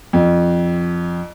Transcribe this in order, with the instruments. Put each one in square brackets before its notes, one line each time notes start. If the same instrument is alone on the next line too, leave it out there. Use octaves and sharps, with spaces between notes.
[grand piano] F2